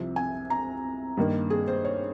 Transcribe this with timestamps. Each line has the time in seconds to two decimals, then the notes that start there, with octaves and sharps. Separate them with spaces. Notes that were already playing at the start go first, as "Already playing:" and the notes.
Already playing: C2 C3 F3
0.16 G#5
0.50 A#5
1.17 G2 D#3 A#3
1.50 G#4
1.68 C5
1.85 C#5